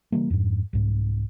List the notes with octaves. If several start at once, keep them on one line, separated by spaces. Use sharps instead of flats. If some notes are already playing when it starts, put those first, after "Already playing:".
C#3 E3 G3 A#3
F2 G#2
C2 G#2